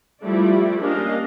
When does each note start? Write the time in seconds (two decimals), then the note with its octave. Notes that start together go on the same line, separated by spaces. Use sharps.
0.23 F3 G3 A3 E4 D5
0.79 A#3 C#4 D4 G4 D#5 F5